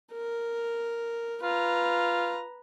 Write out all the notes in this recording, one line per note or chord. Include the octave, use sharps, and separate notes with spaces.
A#4
F4 B4 A#5